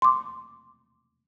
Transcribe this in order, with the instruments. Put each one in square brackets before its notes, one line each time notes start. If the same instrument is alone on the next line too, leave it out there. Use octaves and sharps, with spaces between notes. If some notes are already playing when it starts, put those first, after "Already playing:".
[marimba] C6 D6